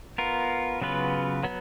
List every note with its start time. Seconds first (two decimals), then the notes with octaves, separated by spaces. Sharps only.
0.18 B3 F4 A#4
0.81 C#3 F#3 B3 F4 B4
1.43 F#3 B3